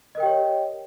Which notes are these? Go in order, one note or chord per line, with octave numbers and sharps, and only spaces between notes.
G4 A#4 C#5 D#5 G5